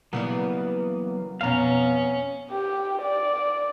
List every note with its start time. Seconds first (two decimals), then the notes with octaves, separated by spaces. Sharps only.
0.13 C#3 E3 F#3 G3 A#3 B3
1.41 F2 B2 B3 C#4 F5 A#5
2.51 G4
3.02 D5